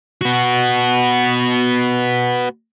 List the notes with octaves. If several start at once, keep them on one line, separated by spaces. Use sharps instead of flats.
B3 F#4